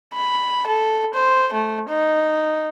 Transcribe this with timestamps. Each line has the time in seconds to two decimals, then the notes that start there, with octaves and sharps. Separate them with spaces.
0.14 B5
0.67 A4
1.14 C5
1.53 A3
1.89 D#4